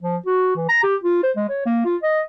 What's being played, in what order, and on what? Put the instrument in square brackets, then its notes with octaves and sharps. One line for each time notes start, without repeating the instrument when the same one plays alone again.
[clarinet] F3
F#4
E3
A#5
G4
F4
C5
G#3
C#5
A#3
F4
D#5